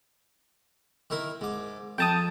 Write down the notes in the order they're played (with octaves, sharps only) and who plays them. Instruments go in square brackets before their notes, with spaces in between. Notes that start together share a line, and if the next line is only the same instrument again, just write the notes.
[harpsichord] D#3 E4 A#4
G#2 D6
[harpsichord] F2 A#5 [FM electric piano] G5 A5 D#6